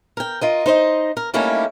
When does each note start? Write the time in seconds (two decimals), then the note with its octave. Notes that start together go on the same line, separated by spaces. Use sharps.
0.17 A#4 G5
0.41 F4 A#4 D#5
0.66 D#4 C5 D#5
1.17 A#4
1.34 G3 A3 A#3 C#4 D#4 E4